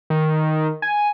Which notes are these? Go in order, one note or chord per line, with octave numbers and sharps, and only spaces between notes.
D#3
G#5